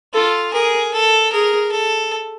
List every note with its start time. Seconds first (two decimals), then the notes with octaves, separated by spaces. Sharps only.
0.14 F4 A4
0.53 G#4 A#4
0.93 A4
1.32 G#4 A#4
1.71 A4